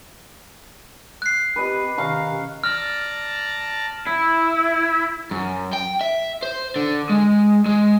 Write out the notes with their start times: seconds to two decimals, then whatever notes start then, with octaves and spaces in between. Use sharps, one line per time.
1.22 F#6 C7
1.56 C4 G4 B4 D#5
1.98 C3 D#3 C#4 F5 A#5 C#6
2.64 D5 A5 A#5 F6
4.07 E4
5.31 F#2
5.73 G5
6.01 E5
6.43 C5
6.76 D3
7.09 G#3
7.66 G#3